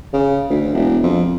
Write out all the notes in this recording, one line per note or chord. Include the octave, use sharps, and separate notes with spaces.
C#3
D2
E1
F2